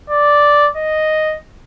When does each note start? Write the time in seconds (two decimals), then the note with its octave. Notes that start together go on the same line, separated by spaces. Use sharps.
0.10 D5
0.77 D#5